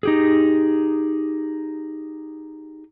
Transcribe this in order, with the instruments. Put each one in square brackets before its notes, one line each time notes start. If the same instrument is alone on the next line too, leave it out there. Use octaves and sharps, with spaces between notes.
[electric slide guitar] D#4 G4 G#4